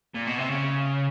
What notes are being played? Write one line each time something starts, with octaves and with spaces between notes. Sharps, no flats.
A#2
B2
C3
C#3